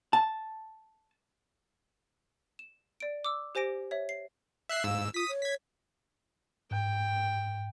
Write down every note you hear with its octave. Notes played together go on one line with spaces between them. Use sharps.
A5
E7
D5 D7
D6 E6
G4 C5 G#5 A#6 D7
C#5 E5
C7
E5 F#6 C7
G#2 F5 E6
F4 D#6 B6
C#5
G#6 B6
G#2 G5